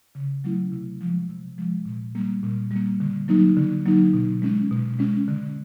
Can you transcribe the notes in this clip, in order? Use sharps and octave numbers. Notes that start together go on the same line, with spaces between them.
C#3
F#3 A3 C#4 E4
C3
F3 G#3
C3
F3 G#3
A#2
G3 A#3
A#2
G3 A#3
D3
F#3 A#3 D#4
D3
F#3 A#3 D#4
B2
G#3 C#4
B2
G#3 C#4
D3